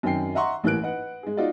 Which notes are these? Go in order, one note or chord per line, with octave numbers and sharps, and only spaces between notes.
F#2 D#3 C4 G5 C7
D#5 E5 F#5 A#5 C6 C#6
A1 E3 A#3 F#6 D7
B4 D#5 F#5
G#3 G#4
D#4 F4 F#4 D5 D#5